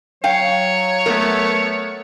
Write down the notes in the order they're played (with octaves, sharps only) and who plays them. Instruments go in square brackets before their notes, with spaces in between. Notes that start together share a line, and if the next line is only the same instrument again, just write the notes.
[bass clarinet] F#3 [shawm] C#5 [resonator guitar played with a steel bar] F5 G5
[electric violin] A3 B3 [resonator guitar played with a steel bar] A#4